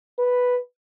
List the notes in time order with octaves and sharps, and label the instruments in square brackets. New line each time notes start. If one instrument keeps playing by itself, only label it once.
[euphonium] B4